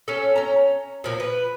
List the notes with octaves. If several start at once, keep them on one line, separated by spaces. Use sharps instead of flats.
C#4 A4
C#4 A#5
A#2 F3 A#3
B4